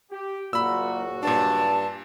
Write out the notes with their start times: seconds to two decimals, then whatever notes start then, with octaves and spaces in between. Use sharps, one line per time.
0.11 G4
0.53 F#1 A#2 F#4 B5 E6
1.23 G2 A#2 D4 A5